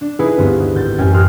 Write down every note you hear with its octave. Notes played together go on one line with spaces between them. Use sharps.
D4
D#4 E4 G#4 B4 D#5
D2 G2 B3 C4
G#1 G6 A6
A1 F#2 C#4 G5 G#5
C6 D#6 F6 F#6